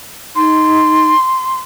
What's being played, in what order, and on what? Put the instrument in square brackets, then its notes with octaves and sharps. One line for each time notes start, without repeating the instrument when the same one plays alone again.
[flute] D#4 [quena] C6